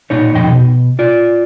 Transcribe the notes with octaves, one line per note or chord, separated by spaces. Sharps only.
A#2 D#4 C#5
B1 F2 D#4 G5
B2
F4 D5